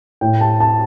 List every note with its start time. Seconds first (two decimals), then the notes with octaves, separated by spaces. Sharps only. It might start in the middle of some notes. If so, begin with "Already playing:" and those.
0.21 A2 G5
0.41 A5
0.60 A5